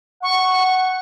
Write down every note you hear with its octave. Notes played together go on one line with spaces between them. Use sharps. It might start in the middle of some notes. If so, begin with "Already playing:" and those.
F#5 C#6